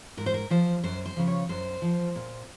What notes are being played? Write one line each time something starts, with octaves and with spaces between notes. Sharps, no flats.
G#2 A#4
C5
A#4
F3 C5
F#2 C5
C5
C#3 F3
C#5
F#2 C5
F3
A#2